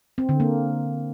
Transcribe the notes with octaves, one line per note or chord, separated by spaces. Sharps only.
C4
D3
A#3